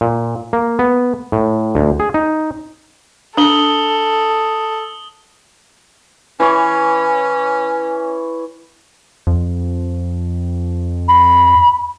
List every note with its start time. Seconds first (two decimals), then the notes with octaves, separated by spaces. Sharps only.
0.01 A#2
0.53 A#3
0.79 B3
1.32 A2
1.75 D2
2.00 G#4
2.14 D#4
3.37 D4 A4 D#6 F#7 G7
6.40 E3 C#4 C#5
9.27 F2
11.08 B5